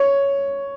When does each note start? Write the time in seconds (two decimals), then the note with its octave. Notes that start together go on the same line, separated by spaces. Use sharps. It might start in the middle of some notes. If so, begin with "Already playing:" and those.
Already playing: C#5